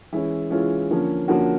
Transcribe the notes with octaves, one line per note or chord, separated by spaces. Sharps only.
E3 G#3 C#4 E4
E3 G#3 C#4 F4
D3 F3 A#3 C#4
D3 F3 A#3 C#4 F#4